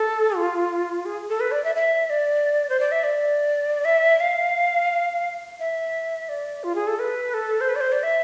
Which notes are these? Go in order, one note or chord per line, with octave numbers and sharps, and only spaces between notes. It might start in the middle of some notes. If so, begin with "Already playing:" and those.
Already playing: A4
F4
G#4
A4
B4
D5
E5
E5
D5
C5
D5
E5
D5
E5
F5
E5
D5
F4
G#4
A4
B4
A4
C5
B4
D5
C5
D5
E5